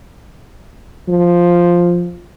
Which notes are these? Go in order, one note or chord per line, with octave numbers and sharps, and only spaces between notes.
F3